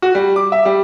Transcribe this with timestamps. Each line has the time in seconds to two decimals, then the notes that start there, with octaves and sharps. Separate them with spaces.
0.02 F#4
0.15 G3
0.36 D6
0.52 E5
0.65 G3